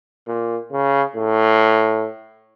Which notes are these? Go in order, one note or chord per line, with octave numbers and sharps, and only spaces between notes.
A#2
C#3
A2